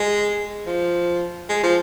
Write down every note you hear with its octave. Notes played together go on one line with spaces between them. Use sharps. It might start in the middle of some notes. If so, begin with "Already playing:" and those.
Already playing: G#3
F3
G#3
F3